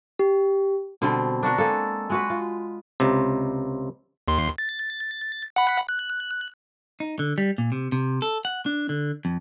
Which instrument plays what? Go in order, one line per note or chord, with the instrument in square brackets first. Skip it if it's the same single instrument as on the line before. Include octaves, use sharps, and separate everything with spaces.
[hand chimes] G4
[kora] B2 D3 G3 C4
D4 F#4 A#4
G#3 A#3 A4
G#3 F#4 B4
F4
[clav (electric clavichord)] C#2 C3
[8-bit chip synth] D#2 C6
A6
F#5 B5
F#6
[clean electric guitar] D#4
D3
G3
A#2
C3
C3
A4
F#5
D4
D3
F2